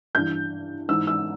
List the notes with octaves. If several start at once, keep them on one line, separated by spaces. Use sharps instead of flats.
G2 E3 G6
G#2 E3 E6
E6